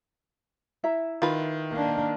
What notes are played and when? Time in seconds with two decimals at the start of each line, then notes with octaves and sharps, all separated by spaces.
0.84 E4 E5 A#5
1.22 D#3 F4 B4
1.72 A#3 D4